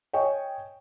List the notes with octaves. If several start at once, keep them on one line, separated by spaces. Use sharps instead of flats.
C#5 D#5 G5 G#5 C#6